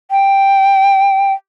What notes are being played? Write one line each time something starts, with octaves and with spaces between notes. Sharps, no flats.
G5